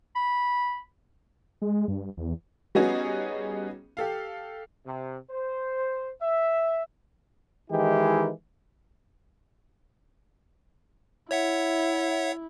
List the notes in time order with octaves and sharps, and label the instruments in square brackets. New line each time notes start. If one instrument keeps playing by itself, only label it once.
[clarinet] B5
[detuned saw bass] G#3
G2
E2
[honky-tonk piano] G3 B3 C#4 D#4 F#4 G#4
G4 A4 F5
[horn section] C3
C5
E5
[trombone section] D#3 E3 G#3 E4 G4
[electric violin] E4 [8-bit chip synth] C#5 E5 F#5